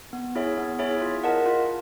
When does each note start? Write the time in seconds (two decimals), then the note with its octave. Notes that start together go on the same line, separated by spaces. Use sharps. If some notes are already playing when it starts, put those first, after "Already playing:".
0.13 B3
0.35 E4 G#4 C#5 E5
0.58 B3
0.79 E4 G#4 C#5 E5
1.01 F4
1.24 A#4 D#5 F#5 A5
1.46 F4